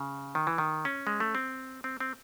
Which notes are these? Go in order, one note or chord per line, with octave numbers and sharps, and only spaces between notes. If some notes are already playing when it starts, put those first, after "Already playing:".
Already playing: C#3
D#3
E3
D#3
C#4
G#3
A3
C4
C4
C4